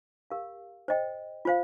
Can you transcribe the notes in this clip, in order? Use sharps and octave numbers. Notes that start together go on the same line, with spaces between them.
G4 A#4 F5
C5 D#5 G5
F4 C5 F5